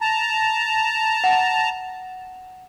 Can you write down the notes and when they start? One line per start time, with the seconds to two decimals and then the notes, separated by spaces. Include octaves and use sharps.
0.01 A5 A#5
1.24 F#5